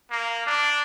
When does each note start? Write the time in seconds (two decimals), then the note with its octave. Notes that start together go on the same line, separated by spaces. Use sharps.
0.10 A#3
0.47 D4